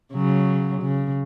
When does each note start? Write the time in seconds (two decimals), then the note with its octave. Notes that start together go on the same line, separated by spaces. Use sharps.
0.13 C#3 F#3
0.81 C#3